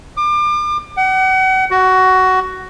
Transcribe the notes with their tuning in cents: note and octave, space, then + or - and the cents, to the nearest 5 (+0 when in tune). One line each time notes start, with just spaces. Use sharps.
D6 +35
F#5 +35
F#4 +15